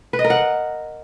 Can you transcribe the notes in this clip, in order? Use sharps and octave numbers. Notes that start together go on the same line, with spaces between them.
B4
D#5
A#4
F#5